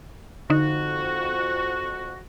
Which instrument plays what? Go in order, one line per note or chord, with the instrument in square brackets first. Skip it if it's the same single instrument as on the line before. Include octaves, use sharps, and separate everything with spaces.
[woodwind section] F2 F#4 [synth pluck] D3 D#4